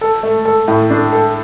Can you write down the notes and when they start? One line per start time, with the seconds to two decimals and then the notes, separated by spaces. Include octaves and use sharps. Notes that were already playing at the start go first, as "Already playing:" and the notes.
0.01 A4
0.23 A3
0.45 A4
0.68 A2
0.90 D4
1.12 A4